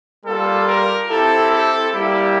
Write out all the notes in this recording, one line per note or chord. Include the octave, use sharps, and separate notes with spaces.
G3 A#3 F4 A4
A#4
C4 E4 G4 A4
A4
G3 A#3 E4 G4